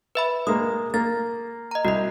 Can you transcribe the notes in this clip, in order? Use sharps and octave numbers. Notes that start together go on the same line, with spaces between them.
B4 E5 B5
G#3 A#3 D#6
A#3 A6
D#5 A#5
C2 F#4 D#5